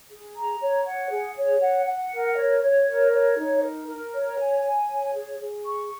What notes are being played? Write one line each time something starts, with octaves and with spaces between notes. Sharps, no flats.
G#4
A#5
C#5
F#5
G#4
C#5
F#5
F#5
A#4
C#5
C#5
A#4
C#5
D#4
A#4
A#4
C#5
G#5
G#5
C#5
G#4
G#4
C#6